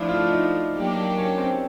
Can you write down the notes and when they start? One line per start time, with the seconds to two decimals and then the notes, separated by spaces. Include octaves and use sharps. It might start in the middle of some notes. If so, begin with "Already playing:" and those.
Already playing: F3 A3 D4 E4
0.08 F4
0.29 D#4
0.73 F#3 A#3 D4 G4
1.17 C#4
1.38 C4